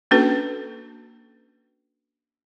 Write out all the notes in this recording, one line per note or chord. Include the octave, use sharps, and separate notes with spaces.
A#3 C#4 D4 F#4 A4 B4